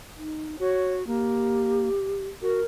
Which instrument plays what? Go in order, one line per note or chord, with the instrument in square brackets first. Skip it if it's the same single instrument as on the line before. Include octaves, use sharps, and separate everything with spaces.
[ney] D#4
[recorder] F#4 [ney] C#5
[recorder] A#3 [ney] G4
[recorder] F#4 [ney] A#4